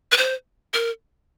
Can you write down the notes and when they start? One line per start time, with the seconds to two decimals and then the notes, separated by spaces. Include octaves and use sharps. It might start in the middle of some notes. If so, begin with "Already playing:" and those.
0.12 B4
0.17 C5
0.74 A#4